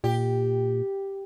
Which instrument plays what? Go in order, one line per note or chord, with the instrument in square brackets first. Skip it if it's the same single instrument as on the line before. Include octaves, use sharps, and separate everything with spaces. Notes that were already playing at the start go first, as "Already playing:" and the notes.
[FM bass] A#2 [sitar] G4